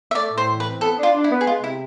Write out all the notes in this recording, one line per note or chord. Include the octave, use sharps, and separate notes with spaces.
E5
A3 D5
A2
C5
E3
B4
C4
B3 A4
D4 F4
D4
E4
B3
G#4
G#3 F4
C3 E4